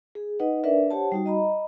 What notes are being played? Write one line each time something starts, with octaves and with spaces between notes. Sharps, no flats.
G#4
D#4 B4 D#5 F#5
D4 A#4 B4 D5 E5
G4 C5 C#5 F#5 A5
G3 D#4 F#4
D#5 A#5 B5